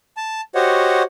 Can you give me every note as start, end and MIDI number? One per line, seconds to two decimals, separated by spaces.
0.17 0.41 81
0.55 1.03 66
0.55 1.03 67
0.55 1.03 72
0.55 1.03 73
0.55 1.03 75
0.55 1.03 78